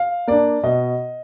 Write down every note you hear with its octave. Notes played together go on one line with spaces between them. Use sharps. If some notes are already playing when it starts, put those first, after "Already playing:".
Already playing: F5
A#3 D4 D5
B2 D#5